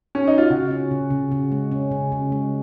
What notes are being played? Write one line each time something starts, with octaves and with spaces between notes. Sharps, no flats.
C#4
D#4
F4
C#3 F#4
C#4
C#3
C#3
C#3
G#3
C#4
C#3
C#3
G#3